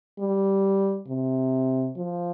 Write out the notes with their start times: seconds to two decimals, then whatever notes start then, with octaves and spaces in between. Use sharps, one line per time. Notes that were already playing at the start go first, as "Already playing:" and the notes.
0.19 G3
1.08 C3
1.97 F3